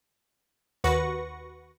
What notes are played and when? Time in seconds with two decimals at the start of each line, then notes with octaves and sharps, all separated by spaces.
0.84 D#2 F#4 B4 F#5 C#6 A#6